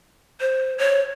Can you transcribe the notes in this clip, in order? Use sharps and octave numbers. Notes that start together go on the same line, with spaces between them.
C5
C#5